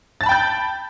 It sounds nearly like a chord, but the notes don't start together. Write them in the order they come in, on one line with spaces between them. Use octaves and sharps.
A6 A5 B5 G5 G6